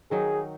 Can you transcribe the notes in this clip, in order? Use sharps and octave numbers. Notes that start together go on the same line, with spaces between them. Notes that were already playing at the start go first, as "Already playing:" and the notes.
D#3 F#3 D#4 G#4